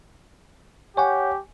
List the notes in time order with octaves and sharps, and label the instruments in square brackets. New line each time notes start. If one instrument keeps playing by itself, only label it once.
[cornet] G4 [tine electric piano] C#5 F#5 [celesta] G#5 C#6 G6